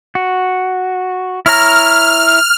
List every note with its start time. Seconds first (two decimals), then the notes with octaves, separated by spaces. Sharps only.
0.15 F#4
1.46 E4 C#5 A#5 F6